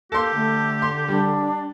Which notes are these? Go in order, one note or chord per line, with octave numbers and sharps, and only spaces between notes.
A#3 G4 A4 C6
D3 A3
C6
G3 D4